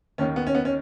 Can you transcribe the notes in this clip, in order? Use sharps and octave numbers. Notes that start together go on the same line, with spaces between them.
D#2 D#3 C#4
B3
C#4
B3
C#4